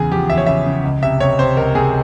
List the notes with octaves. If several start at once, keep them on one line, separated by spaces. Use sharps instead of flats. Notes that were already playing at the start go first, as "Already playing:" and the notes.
Already playing: E2 C#3 G#4
F3 G4
E2 E5
C#5
C#3 E5
C#3
C#2
C3 E5
C3 C#5
C3 C5
C#2 A#4
C3 G#4